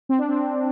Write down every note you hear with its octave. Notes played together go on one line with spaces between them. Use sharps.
C4
D4
C4